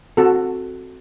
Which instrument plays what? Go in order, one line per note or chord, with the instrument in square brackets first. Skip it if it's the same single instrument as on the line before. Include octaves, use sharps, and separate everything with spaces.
[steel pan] C4 F#4 A4